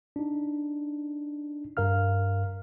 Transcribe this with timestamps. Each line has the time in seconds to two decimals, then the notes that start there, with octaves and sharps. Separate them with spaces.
0.16 D4 D#4
1.77 G2 A#4 F5 F6